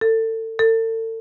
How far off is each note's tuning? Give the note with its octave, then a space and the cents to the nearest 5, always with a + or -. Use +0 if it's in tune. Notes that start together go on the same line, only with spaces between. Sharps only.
A4 +30
A4 +40